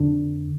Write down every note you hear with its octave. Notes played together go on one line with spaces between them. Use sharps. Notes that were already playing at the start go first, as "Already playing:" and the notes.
Already playing: F2 D3 D4